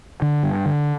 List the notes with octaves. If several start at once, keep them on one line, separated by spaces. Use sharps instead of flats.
D3
G2
D3